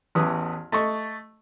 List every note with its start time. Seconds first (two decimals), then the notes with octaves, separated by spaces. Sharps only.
0.15 A1 E2 B4 D#6
0.72 A3 D#5 C#6